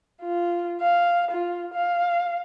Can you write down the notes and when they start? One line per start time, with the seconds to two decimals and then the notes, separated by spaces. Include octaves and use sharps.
0.22 F4
0.81 F5
1.31 F4
1.74 F5